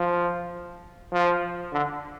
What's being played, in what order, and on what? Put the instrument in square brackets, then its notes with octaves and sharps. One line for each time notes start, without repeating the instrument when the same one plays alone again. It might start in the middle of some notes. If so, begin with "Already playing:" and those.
Already playing: [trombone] F3
F3
D3